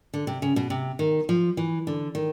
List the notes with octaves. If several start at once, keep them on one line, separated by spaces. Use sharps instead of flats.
D3
C3
C#3
B2
C3
D#3
F3
E3
D3
D#3